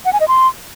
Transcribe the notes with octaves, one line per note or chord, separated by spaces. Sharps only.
F#5
G#5
D#5
C6